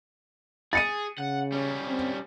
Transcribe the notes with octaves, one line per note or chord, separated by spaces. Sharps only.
G#4 A6 C#7 D#7
C#3 F#5
G3 C#4
C4